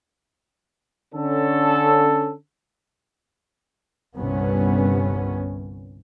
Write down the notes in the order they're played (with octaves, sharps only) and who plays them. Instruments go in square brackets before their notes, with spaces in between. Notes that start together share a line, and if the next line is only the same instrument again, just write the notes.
[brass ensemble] D3 C#4 A4
[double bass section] G1 C2 G2 C3 B3 C#4